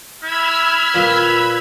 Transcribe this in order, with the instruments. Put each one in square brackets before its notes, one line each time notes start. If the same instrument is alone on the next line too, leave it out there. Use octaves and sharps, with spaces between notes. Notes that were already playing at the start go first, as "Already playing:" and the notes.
[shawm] E4 [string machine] B5 E6 G#6 [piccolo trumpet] F6
[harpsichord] A#2 C4 [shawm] B4